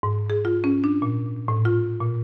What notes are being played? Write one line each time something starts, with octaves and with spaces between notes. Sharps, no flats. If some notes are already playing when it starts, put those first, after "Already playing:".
G#2
G#4
F4
C#4
D4
A#2
A2
F4
A#2